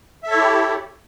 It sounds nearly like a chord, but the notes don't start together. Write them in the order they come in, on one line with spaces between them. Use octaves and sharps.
E5 A4 C#5 E4 G4